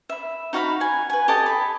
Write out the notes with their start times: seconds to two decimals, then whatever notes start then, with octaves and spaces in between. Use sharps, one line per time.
0.09 E5 B5
0.53 D#4 F#4 F5 B5
0.80 F#5 G#5
1.10 B4 G#5
1.28 G4 A4 D#5 A5
1.46 B5